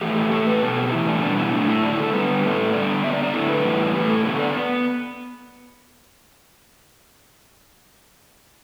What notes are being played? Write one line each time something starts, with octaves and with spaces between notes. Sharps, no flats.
A2 E3 A3 G4
G4
A2 A3 A4
B4
B2 B3 A4
G4
A2 E3 A3 E4
D4
B2 G3 B3 D4
E4
A2 A3 D4
E4
D3 A3 D4
E4
A4
D3 G3 B3 B4
A2 A3
D3 G3 B3 D5
D3 B3 E5
D5
D5
D3 A3 E4
B4
A2 E3 G3 B3
A2 A3 B4
A4
D3 B3 A4
D5
B3